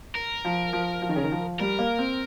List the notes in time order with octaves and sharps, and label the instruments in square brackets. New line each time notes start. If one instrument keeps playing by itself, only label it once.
[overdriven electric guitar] A#4
[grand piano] F3
F3
F3
D#3
C#3
D#3
F3
[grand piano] G3 [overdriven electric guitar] A#4
[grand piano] A#3
C4